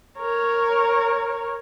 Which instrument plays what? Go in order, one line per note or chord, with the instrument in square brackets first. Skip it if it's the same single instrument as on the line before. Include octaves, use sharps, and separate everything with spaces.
[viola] A#4 C#5